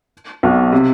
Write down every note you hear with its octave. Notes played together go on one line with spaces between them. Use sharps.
B1 B2
C3